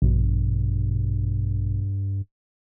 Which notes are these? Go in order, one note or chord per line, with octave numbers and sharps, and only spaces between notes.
A#1 G2 B2